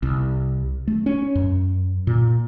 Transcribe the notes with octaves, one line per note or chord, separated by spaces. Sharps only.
C2
A3
C#4
F#2
A#2